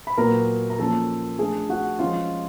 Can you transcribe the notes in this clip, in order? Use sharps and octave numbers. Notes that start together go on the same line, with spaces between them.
B5
A#2 F#3 B3 A#4 A#5
A#5
F3 A#3 C#4 A4 A5
F3 A3 D4 G#4 G#5
F#4 F#5
F3 G#3 C#4 F4 F5